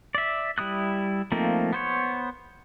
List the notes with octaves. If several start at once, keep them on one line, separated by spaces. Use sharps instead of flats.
D5 E5
G3 E4 D#6 F#6
F3 A3 A#3 C4 D#4
B3 C5 C#5